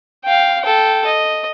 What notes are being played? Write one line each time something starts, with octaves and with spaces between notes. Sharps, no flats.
F5 G5
A4 G5
D#5